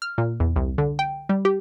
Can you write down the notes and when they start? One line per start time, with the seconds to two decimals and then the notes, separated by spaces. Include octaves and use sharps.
0.02 F6
0.18 A#2
0.40 E2
0.56 C2
0.78 D3
0.99 G5
1.29 G3
1.45 G4